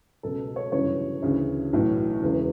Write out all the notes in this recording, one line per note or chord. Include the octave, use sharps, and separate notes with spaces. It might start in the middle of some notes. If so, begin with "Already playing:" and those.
C#2 B2 A4
C#5
G1 F#2 C#3 E3 C#5
D2 C#3 E3
B1 A2 E3
E1 E2 C#3 E3